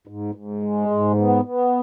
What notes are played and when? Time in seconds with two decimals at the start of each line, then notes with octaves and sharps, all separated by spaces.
0.07 G#2
0.35 G#2
0.63 G#3
0.91 G#2
1.18 B3
1.45 B3